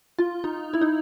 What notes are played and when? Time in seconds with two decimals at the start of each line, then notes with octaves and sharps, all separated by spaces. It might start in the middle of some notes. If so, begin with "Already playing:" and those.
0.19 F4
0.44 D#4
0.74 E4
0.81 D#4